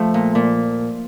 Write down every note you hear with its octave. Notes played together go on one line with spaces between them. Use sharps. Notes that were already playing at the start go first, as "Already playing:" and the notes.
Already playing: F3 A3
A#2
A#2